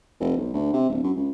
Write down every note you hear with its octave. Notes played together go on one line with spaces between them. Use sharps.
F1
B1
D2
C3
D1
F#2
C#2